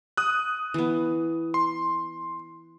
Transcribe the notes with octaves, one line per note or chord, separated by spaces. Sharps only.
D#6 F#6
E3 B3
C6